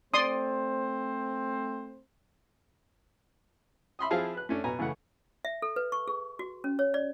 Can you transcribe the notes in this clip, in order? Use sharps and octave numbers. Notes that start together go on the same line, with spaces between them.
A3 C4 C5 D5 C6 D#6
E5 B5 C6 D#6
F3 C4 E4 G#4 F5 A5
B4 F#6
A3 C#4 D4
B2 B3 G#5 A#5
C#3 E3 A3 F#5
E5
A4
B4
C#6
G#4
F#4
C#4
C#5
D5